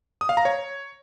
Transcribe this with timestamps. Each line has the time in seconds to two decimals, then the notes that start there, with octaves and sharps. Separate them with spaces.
0.21 D#6
0.29 F5
0.37 A#5
0.45 C#5